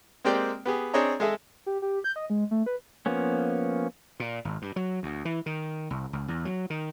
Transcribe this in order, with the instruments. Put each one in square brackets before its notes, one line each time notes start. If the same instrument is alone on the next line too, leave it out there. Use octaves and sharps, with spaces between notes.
[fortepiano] G#3 A#3 C4 G4 D5 G5
B3 G4 G#4
C4 D4 G#4 C#5 D#5 A#5
G#3 G#4 A4 D#5 E5
[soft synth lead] G4
G4
G6
D#5
G#3
A3
B4
[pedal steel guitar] F3 A#3 B3 C#4
[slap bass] A#2
G#1
G2
F#3
D2
E3
D#3
C2
C#2
E2
F#3
D#3